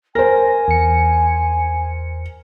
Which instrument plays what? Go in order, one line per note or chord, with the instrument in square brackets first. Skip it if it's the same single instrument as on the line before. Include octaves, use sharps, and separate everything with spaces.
[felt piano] A#4 C5 [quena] G#5 [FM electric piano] A#6
[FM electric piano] E2 C#7